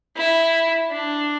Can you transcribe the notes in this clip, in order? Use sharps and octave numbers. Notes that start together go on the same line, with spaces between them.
E4
D4